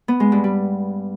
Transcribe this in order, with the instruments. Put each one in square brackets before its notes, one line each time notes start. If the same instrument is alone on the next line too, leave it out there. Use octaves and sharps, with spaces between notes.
[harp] B3
G#3
G2
G3